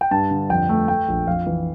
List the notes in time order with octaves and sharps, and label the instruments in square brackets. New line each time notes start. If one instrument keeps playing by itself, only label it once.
[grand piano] G5
G2 A5
D3
F2 G5
A3
A3 G5
A#1
F2 F5
E3